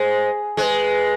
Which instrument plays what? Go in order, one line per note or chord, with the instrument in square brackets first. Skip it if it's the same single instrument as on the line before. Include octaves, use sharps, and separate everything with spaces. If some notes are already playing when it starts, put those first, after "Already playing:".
Already playing: [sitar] G#3 [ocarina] C5
[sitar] G#3 [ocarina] C5
[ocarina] B4